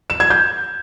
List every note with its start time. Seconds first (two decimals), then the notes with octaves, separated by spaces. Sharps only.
0.10 E7
0.20 G#6
0.30 G6